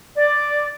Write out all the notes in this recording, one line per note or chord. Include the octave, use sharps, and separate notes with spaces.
D5